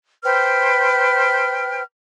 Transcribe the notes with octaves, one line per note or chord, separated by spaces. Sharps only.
B4 C5 G5 F6